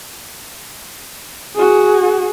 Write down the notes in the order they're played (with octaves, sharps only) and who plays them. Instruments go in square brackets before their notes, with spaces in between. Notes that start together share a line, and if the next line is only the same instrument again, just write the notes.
[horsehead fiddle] F#4 G#4